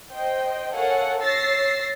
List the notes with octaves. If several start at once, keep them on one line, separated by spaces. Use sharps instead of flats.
C5 D#5 G5
A4 A#4 C#5 F5 F#5 G#5
C#5 E6 A6 A#6 C7